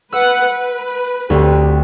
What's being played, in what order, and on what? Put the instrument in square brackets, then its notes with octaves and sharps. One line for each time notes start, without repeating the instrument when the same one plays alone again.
[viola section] B4 F#5 [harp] E6
[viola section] B4
[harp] D2 C4 [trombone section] G4